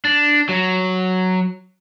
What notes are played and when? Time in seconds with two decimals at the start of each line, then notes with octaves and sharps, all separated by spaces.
0.05 D4
0.49 F#3